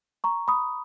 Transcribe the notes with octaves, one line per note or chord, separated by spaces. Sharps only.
A#5 C#6
B5 D#6